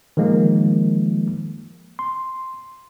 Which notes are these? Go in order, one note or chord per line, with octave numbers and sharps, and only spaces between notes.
D#3 F3 G#3 A#3
C6